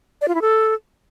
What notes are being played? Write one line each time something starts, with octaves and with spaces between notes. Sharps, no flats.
D5
F4
E4
A4